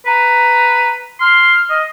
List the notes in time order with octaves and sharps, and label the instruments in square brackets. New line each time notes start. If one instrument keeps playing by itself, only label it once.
[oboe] B4 [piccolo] A#5
[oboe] C6 [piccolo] F6
[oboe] D#5